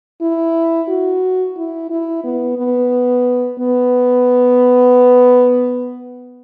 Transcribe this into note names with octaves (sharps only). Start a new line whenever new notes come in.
E4
F#4
E4
E4
B3
B3
B3